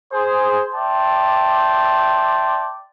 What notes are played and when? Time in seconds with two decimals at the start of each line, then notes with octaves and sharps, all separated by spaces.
0.12 G#4 C5
0.74 D5 E5 G5 A5 C6